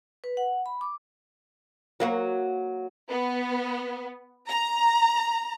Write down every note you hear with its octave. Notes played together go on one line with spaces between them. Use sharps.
B4
F#5
B5
D6
F#3 A#3 F#4
B3
A#5